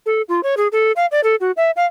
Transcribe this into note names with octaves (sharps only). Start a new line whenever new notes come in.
A4
F4
C#5
G#4
A4
F5
D5
A4
F#4
E5
F5